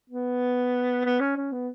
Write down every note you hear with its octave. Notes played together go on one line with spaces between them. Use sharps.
B3
B3
C#4
C#4
B3